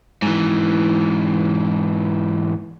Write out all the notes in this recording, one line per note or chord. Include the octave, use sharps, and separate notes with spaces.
G#2 E3